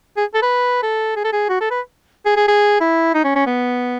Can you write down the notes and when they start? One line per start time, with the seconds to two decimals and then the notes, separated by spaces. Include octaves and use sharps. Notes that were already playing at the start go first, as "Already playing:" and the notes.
0.17 G#4
0.34 A4
0.43 B4
0.83 A4
1.16 G#4
1.24 A4
1.33 G#4
1.49 F#4
1.61 A4
1.71 B4
2.26 G#4
2.37 G#4
2.48 G#4
2.81 E4
3.14 D#4
3.25 C#4
3.36 C#4
3.47 B3